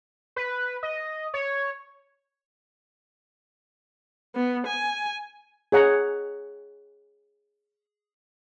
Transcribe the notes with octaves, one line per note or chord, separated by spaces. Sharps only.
B4
D#5
C#5
B3
G#5
G#4 C#5 F#5 A#5